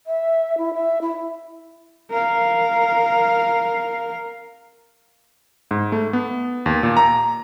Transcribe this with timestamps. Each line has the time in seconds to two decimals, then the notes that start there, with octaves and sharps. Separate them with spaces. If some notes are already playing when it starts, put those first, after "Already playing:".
0.07 E5
0.58 E4
0.74 E5
1.01 E4
2.10 A#4 F5
5.71 G#2
5.92 A3
6.13 B3
6.66 D#2
6.83 A#2
6.97 A#5